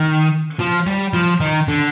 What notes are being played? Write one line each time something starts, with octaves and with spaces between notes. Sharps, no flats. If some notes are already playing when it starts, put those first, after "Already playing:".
Already playing: D#3
F3
G3
F3
D#3
D3